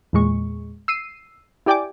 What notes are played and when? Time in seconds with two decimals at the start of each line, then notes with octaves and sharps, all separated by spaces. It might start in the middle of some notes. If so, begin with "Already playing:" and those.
0.13 E2 A#2 G#3 C#6
0.88 E6 C7 D#7
1.66 E4 G4 D5 G5 G#5 D6